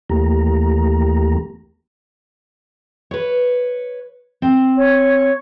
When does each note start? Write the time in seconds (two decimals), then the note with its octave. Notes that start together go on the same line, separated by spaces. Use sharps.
0.10 D#2 E3 A3 A#3 G4 A#5
3.11 B4 C#5
4.42 C4
4.77 C#5